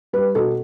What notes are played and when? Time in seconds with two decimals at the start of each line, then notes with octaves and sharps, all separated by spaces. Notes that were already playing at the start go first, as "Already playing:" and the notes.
0.13 G3 B4
0.35 B2 A4